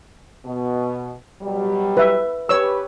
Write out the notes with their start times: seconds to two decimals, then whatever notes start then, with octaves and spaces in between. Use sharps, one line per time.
0.45 B2
1.42 B2 F#3 G3
1.97 B4 E5
2.49 G4 B4 C#5 E6